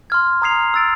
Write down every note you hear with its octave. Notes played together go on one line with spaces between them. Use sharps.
C6 F6 G#6
A#5 D#6 G#6 C7 F7
E6 A6 D7